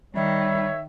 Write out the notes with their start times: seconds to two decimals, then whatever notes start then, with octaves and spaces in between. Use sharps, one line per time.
0.15 D#3 G3 C#5 E5